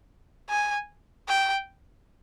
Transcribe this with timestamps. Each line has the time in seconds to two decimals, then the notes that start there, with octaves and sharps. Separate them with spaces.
0.50 G#5
1.28 G5